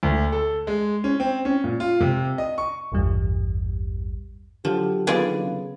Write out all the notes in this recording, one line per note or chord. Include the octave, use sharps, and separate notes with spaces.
D2
A4
G#3
C#4
C4
C#4
A#2
F4
C3
D#5
C#6
A1 E2 G2 G3
D3 F3 F#3 G4
D#3 A#3 B3 F4 G#4 D5 F5
C#3